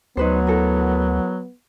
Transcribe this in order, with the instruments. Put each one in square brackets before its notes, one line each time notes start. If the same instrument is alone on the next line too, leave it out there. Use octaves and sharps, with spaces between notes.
[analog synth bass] D2 [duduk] F#3 [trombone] B3 [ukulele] D#4 B4 C5
[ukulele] E4 A4 A#4